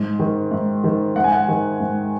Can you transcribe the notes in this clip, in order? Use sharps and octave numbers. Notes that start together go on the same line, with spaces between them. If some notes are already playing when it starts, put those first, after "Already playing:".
Already playing: G#2
D#3
G#2
D#3
G#2 F#5
G#5
F#5
D#3
G#2